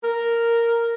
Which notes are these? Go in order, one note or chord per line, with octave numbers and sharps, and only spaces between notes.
A#4